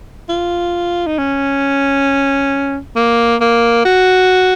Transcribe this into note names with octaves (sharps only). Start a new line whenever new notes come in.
F4
D#4
C#4
A#3
A#3
F#4